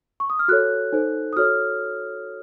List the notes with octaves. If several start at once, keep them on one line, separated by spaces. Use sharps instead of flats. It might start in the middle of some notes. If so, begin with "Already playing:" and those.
C#6
D#6
F6
F#4 A4 C#5 F#6
D#4 A4 C5
D#6
F#4 A4 C#5 F6